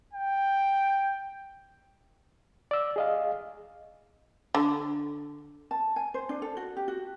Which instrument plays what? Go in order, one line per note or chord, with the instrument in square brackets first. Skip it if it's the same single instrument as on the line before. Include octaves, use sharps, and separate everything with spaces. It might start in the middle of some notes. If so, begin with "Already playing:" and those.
[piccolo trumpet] G5
[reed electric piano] D5 E6
G#4 D#5 F5
[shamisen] D3
[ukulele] A5
G#5
C5
D4
A4
F#4
G4
F#4